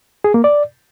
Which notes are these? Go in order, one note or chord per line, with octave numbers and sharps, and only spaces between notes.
G#4
A#3
D5